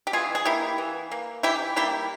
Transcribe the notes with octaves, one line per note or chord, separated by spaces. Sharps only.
G4
E3 F4 G#4
G#4
A#3 E4 G4
E3
A#3
E3 E4 G4
G3 A#3 E4 G4